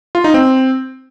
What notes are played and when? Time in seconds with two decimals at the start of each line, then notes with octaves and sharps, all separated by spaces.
0.15 F4
0.24 D#4
0.34 C4